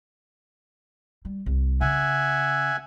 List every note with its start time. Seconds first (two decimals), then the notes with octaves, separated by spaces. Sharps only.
1.25 G3
1.46 C2
1.81 C#3 E5 F#5 G#5